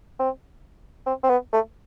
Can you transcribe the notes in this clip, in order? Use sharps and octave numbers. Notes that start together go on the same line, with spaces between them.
C4
C4
C4
B3
A3